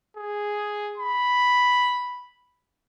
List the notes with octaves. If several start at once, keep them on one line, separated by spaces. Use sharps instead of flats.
G#4
B5